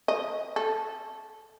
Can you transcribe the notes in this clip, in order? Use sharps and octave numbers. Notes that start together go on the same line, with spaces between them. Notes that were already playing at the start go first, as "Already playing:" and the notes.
D#5
A4